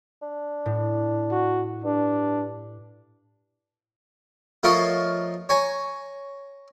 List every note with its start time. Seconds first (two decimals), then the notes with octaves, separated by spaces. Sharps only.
0.22 D4
0.66 A2
1.31 F#4
1.84 G2 D4
4.63 F3 A3 A#4 C#5 D#5 F5
5.49 C#5 G#5 A#5